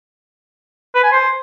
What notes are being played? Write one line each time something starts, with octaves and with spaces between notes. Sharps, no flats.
B4
G#5
C5